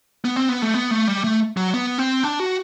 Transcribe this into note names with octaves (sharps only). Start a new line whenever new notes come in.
B3
C4
B3
A3
B3
A3
G3
A3
F#3
B3
C4
D4
F#4